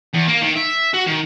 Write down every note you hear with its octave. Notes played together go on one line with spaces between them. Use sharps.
E2
A#3
D#3
E5
F#4
D#3